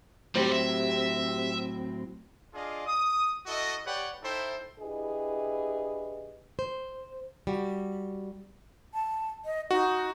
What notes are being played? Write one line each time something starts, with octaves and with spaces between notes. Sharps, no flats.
A2 F#3 G3 C4 G4 C5
E5
D4 F4 G#4 D5 D#5 F5
D#6
E4 F#4 A4 D#5
G4 B4 C#5 D5 F#5 G5
D#4 E4 A4 C5 E5 G5
D4 E4 G4 G#4 B4 D#5
C5
G3 F#4
A5
D#5
D#4 F#4